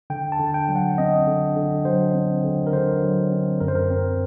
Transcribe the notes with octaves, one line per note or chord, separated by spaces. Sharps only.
D3 G5
A5
D3
G5
F#3
F#5
C4 D#5
D3
D3
F#3 C5
C4
D3
A#4
D3 C5
F#3
C4
F#2 A#4
C5
A#4
C4